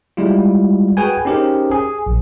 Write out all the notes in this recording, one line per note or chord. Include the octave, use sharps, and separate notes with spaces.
G3 G#3 E4 F4
F#4 G#4 B4 G5 G#5
C#4 D#4 G4 G#4 A#4 C5
G#4
A#1